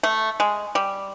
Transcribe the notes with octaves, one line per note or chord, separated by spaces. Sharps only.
A3
G#3
G3